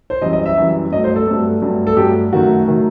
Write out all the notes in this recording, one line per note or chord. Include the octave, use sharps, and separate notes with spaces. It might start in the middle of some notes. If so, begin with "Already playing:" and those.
C5
F#2 E3 G3 D#5
D#5
E5
F#2 E3 G3
G2 F#3 A3 D#5
C5
A4
G2 F#3 A3
G2 F#3 A3
A4
G2 F#3 A3 G4
F#2 D#3 F#3 A3 F#4
D#3 F#3 A3